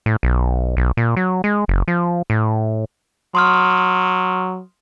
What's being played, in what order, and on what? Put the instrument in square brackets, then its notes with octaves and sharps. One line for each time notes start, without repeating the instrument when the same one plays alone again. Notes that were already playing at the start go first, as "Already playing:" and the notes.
[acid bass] A2
B1
B1
A#2
F#3
G#3
F#1
F3
A2
[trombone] F#3 [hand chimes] C6 D#6 F6